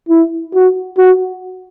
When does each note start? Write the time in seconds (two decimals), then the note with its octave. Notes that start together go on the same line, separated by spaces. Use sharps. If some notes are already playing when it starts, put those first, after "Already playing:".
0.09 E4
0.54 F#4
0.98 F#4